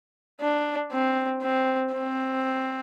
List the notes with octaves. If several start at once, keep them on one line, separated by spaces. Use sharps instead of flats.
D4
C4
C4
C4